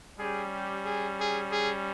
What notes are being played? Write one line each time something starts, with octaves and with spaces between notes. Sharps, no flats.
G3 C#4 G4 G#4
G4
G#4
G#4
G#4